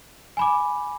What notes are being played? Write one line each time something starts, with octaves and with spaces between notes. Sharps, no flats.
G#5 B5 D6